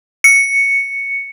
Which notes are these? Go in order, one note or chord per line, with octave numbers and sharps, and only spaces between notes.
C#7